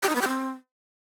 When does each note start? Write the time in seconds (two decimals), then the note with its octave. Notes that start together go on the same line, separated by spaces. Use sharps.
0.03 G4
0.09 D#4
0.15 B3
0.21 G4
0.28 C4